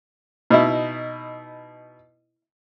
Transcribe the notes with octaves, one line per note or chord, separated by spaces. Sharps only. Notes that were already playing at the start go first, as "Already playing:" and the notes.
B2 D#4 E4